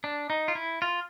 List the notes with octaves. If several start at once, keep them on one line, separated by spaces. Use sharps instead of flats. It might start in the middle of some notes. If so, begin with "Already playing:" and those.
D4
D#4
F4
E4
F4